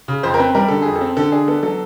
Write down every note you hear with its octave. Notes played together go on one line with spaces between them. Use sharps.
C#3
F2 C5
A#4
C4 B4
G3 A#4
D3 A4
F2 G#4
A4
C4
D3 A4
D4 G#4
B3 A4
F#3 A4